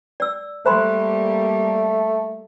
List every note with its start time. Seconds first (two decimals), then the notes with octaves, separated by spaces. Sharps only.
0.20 D5 E6
0.66 G3 A3 A#3 C5 B5 C6